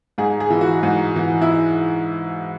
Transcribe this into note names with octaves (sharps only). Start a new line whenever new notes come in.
G#2 G#4
G#4
E3
F#4
G#2
E3
E4